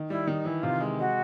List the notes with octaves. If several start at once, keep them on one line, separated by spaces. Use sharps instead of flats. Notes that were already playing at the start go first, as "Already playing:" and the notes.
Already playing: D#3
G3 E4
D#3 D#4
E3 E4
C3 F4
G#3
G#3 F#4